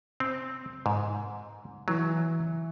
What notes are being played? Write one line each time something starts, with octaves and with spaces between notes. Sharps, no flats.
C4
G#2
E3 F#3